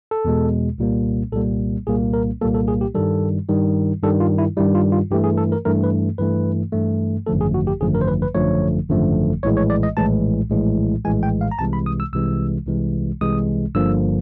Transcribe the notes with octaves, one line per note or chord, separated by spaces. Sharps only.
A4
E2 B2 G#3
C2 A#2 G3 A#3
C2 A#2 G3 A#3 A4
C2 A#2 G3 A#3 G#4
A#4
C2 A#2 G3 A#3 A4
A4
G#4
G4
G2 D#3 G3 A4
G2 D#3 G3
G2 D#3 G3 A4
F4
E4
G2 D#3 G3 E4
F4
F4
G2 E3 A3 G4
G#4
A4
A#4
G2 E3 A3 A#4
B4
G2 E3 A3 B4
G2 E3 A3
G#1 F#2 D3 F3 A3 A4
G#4
F#4
G4
G#1 F#2 D3 F3 A3 G#4
A#4
C5
B4
B4
G#1 F#2 D3 F3 A3 C#5
G#1 F#2 D3 F3 A3
A#1 A2 E3 G#3 C#5
C#5
D5
D#5
A#1 A2 E3 G#3 A5
A#1 A2 E3 G#3
A#1 A2 E3 G#3 G#5
G5
F5
A#5
C2 C3 E3 G#3 A5
B5
D#6
E6
C2 C3 E3 G#3 E6
C2 C3 E3 G#3
C2 C3 E3 G#3 D#6
G1 G2 D3 F3 A#3 E6